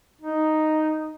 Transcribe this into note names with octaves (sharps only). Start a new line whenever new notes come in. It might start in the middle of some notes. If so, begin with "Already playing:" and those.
D#4